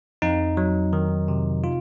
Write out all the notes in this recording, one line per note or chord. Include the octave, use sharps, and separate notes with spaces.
F2 D#4
F#3
D#3
C3
F4